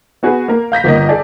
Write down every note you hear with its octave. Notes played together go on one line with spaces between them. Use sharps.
B3 F#4 G#4 B4
A#3 A#4
F5 G6 A#6 B6
G1 A#3 D#5
G#4 A4 D5